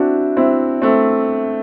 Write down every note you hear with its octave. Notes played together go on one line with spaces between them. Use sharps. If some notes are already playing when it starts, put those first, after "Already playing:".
Already playing: C4 D4 E4 F#4
C4 E4
A3 C4